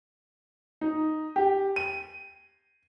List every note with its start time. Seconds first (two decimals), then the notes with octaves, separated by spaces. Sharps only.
0.81 D#4
1.36 G4
1.76 D#7